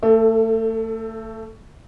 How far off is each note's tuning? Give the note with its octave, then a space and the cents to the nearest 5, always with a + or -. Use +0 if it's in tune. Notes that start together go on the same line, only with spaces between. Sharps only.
A3 +30 A4 +0